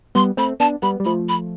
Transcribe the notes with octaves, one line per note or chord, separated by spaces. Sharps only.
G3 B3 C6
A3 C4 B5
B3 D4 A5
G3 B3 B5
G3
F3 A3 B5
B5